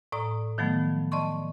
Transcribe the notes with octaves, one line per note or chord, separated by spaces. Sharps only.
A2 D5 A#5 D#6
D#3 F3 F#3 A3 B3
D5 D#5 A5 C6 C#6